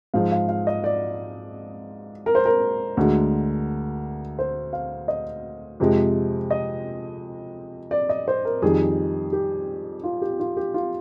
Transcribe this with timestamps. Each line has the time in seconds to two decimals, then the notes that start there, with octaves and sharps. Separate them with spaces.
0.14 G#2 F3 G#3 F5
0.32 F5
0.49 F5
0.67 D#5
0.84 D5
2.26 A#4
2.35 C5
2.46 A#4
2.97 D2 D3 G#3
4.39 C5
4.73 F5
5.08 D#5
5.80 F2 C3 F3 G#3
6.51 D#5
7.91 D5
8.09 D#5
8.28 C5
8.45 A#4
8.62 F2 D#3 G3 G#4
9.33 G4
10.04 F4
10.22 G4
10.40 F4
10.57 G4
10.74 F4